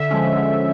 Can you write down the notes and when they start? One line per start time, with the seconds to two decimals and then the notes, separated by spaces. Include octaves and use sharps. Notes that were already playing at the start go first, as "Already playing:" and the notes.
Already playing: D3 E5
0.11 F3 G#3 C#4
0.36 D3